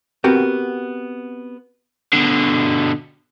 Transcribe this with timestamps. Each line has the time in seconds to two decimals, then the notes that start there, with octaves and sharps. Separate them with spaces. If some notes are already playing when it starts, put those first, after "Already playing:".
0.24 B3 C4 F#4 G4 A#4
2.13 B2 D3